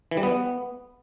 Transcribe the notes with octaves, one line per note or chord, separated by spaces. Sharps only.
E3
G3
B3